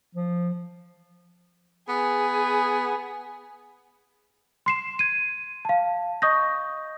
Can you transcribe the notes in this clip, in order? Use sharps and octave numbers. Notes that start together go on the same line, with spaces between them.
F3
B3 G#4
C6 C7 E7
G#6 D#7
F5 A5
D#5 C#6 D#6 G6 A#6